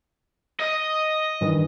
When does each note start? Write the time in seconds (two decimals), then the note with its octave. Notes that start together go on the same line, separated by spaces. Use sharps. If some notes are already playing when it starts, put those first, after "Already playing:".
0.60 D#5
1.41 G2 D#3 E3